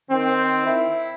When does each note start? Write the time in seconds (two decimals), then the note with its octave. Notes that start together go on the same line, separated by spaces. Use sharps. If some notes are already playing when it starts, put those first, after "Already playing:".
0.10 D#3 C4
0.66 E4